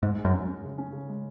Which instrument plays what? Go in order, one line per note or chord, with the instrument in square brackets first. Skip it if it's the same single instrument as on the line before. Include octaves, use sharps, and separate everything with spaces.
[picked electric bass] G#2 [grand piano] G#3
[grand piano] G#3
[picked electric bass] F#2
[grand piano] C#4
C#4
C#3
C#4
C#3
G#3